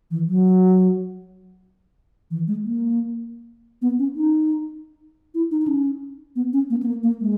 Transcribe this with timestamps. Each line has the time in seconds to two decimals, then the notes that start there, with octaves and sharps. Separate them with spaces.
0.11 E3
0.27 F#3
2.31 E3
2.47 G#3
2.64 A#3
3.82 B3
3.99 C#4
4.16 D#4
5.35 E4
5.51 D#4
5.62 D#4
5.68 C#4
6.36 B3
6.53 C#4
6.70 A#3
6.83 B3
6.86 A#3
7.03 A#3
7.21 G#3